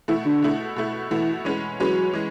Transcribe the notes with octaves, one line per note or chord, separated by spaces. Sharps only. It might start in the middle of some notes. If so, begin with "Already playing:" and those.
B2 E3 A3 E4
D3
B2 A3 E4
B2 A3 E4
B2 E3 A3 E4
E3 G#3 C#4 G#4 B4
E3 F#3 G#3 C#4 G#4 B4
E3 G#3